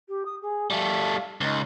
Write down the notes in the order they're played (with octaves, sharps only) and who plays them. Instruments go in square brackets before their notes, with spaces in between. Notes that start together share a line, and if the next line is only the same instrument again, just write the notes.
[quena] G4
D#6
G#4
[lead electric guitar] G3 A3 [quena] F5
[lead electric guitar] C#2 [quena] D#4